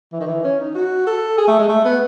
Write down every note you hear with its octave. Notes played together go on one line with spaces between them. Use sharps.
E3
D#3
E3
C#4
D#4
F#4
A4
G#4
A3
G#3
A3
B3